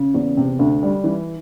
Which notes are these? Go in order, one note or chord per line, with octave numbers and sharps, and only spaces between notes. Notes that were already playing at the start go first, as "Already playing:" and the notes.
Already playing: C#3
E2
C3
D2
G3
E3